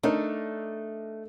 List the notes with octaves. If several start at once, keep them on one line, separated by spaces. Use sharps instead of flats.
A3 D4 D#4 A#4